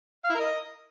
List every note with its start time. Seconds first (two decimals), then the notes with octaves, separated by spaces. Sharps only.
0.25 F5
0.30 E4
0.35 A#4
0.40 D#5